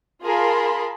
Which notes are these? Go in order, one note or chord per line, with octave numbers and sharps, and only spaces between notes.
F4 G#4 A#4 A5 B5 C6